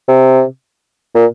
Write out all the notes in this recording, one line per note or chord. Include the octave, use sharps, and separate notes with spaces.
C3
A#2